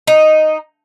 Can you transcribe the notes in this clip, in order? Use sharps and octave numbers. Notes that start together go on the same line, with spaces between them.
D#4